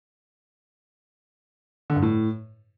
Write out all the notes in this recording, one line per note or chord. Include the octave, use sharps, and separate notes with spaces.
D3
G2
A2